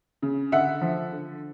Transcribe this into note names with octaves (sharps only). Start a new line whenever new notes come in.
C#3
D3 E5 F#5
F3
D3